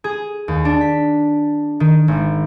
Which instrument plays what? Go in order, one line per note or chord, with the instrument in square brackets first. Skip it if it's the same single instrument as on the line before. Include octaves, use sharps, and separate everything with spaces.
[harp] G#4
D#2
D4
B6
D#3
G#1